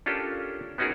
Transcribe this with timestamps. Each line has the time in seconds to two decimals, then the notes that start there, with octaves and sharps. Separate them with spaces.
0.06 C#4 D4 F4 G4 A4 A#4
0.78 B3 C#4 D#4 F#4 G#4 A#4